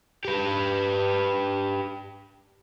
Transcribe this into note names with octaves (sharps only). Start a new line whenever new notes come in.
G4 B4